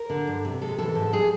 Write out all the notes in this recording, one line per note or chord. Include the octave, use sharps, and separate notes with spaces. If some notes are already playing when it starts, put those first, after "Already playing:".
Already playing: A#4
D3
G2
C3
G#3 A4
E3 A4
G#2
G3 G#4